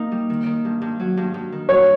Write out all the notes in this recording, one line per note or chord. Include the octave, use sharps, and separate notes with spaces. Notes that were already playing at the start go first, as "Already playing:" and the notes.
Already playing: A#3 D#4
G3
D#3
D#3
G2
G2
F#3
G2
G2
D#3
G3 C#5